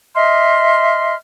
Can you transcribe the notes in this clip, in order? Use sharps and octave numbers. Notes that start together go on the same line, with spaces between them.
D#5 E5 C6 F6